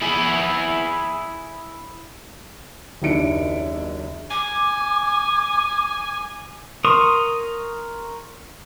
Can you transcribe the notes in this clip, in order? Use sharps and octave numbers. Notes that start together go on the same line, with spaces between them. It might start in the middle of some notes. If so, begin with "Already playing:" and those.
E4 G#4
F#1 D#2 D4 E4 C#7 D7
G#5 D6
A#4 C6 C#6 D#6